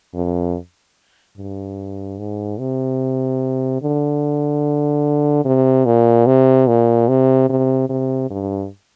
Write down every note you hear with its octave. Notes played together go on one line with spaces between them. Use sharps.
F2
G2
G#2
C3
D3
C3
A#2
C3
A#2
C3
C3
C3
G2